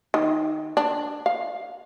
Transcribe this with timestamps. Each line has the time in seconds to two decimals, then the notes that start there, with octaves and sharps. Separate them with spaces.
0.14 D#3
0.77 D4
1.26 F5